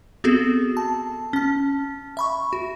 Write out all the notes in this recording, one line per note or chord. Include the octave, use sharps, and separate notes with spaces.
B3 C4 F#4 G#4 A4
A5
C#4 A5
E5 B5 C#6
F#4